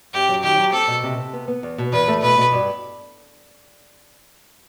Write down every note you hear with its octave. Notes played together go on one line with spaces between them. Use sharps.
F#2 G4
F#3
D#3 G4
F#3
C4 A4
B2
C3
C3
B3
B3
E2
B2
E2 B4
A3
B2 B4
B2
G2